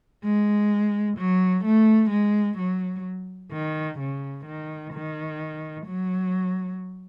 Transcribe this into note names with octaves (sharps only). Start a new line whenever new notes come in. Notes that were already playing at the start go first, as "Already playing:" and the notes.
G#3
F#3
A3
G#3
F#3
D#3
C#3
D#3
D#3
F#3